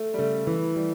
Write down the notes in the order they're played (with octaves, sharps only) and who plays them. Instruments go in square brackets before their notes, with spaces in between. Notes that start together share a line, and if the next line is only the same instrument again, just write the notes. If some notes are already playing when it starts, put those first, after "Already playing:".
Already playing: [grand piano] A3
G3
[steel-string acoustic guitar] C#3 [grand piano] A3
[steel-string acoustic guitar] E3
G3